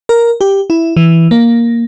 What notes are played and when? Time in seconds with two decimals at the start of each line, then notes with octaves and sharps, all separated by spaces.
0.09 A#4
0.41 G4
0.70 E4
0.97 E3
1.31 A#3